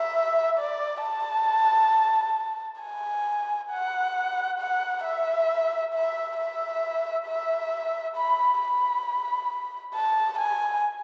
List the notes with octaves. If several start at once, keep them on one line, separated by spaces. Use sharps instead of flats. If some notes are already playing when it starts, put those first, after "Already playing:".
Already playing: E5
D5
A5
G#5
F#5
F#5
E5
E5
E5
E5
B5
B5
A5
G#5